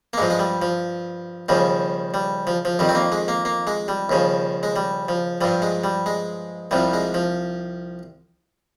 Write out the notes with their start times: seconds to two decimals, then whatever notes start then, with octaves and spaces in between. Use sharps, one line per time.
0.13 A#3
0.17 G2 F3 G#3
0.30 G#3
0.39 G3
0.62 F3
1.49 D#2 C#3 F3 G3
2.14 G3
2.47 F3
2.65 F3
2.79 F2 D#3 G3
2.89 C4
2.95 A#3
3.12 G#3
3.28 A#3
3.45 A#3
3.67 G#3
3.88 G3
4.09 D#2 C#3 F3
4.63 G#3
4.76 G3
5.09 F3
5.41 G2 F3 G3
5.62 G#3
5.84 G3
6.06 G#3
6.71 C2 C3 F3 G3
6.93 G#3
7.14 F3